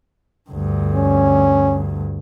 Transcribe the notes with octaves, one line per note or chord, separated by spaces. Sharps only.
D2 G2
C#4